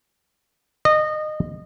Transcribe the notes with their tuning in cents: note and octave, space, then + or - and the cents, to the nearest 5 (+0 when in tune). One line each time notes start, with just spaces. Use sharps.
D#5 -20